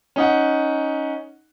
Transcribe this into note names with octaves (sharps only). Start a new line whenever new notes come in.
C#4 D#4 F#5